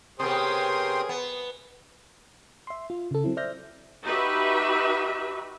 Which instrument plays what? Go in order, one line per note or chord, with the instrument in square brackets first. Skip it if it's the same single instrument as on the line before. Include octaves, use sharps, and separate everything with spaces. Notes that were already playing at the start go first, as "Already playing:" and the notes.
[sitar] C3 B3 [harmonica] G#4 A#4 C#5 [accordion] G5 C6 D#6
[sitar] B3
[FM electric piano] E5 C6
F4
C#3 A4
F#3 C4 E4
C5 D5 E5 F6 G6 A#6
[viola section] D#4 F#4 G4 B4 E5